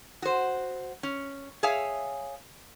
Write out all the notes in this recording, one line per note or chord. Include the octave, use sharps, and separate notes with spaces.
F#4 C5
C#4
G#4 C#5 E5 F5 G#5